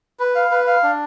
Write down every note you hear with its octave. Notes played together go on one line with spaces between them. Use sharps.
B4
F5
B4
F5
D4